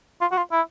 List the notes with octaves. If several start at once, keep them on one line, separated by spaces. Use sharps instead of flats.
F4
F#4
F4
E4